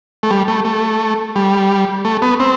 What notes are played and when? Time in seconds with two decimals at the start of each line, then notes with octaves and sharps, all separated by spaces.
0.23 A3
0.31 G3
0.48 A3
0.65 A3
1.36 G3
2.05 A3
2.22 B3
2.40 C4